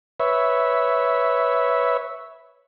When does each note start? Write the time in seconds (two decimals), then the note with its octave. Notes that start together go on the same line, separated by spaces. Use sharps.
0.20 B4 C#5 E5